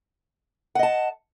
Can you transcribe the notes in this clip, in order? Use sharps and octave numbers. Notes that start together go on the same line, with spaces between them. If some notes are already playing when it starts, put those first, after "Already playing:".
D#5 F#5 A5